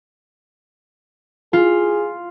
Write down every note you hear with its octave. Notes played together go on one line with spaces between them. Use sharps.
F4 G#4